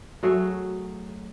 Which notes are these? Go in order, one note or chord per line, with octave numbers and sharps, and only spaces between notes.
F#3 A3 G#4 C#5